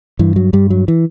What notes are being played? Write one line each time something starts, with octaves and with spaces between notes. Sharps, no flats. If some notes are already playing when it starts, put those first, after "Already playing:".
G2 E3
F#3
G2 G3
F#3
E3